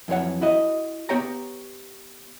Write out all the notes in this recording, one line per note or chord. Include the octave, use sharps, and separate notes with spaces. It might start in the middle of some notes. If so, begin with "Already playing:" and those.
F2 E3 F#3 C#5 F#5
E4 F#4 D#5
B3 G4 C#5 G5 A#5